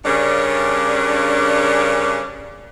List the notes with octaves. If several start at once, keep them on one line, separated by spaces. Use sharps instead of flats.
G2 C#3 C#4 D4 A#4 D5